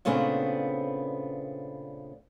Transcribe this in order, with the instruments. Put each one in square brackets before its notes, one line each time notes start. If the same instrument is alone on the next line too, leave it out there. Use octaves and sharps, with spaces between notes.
[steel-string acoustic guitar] A#2 C#3 A3 B3 C4 D4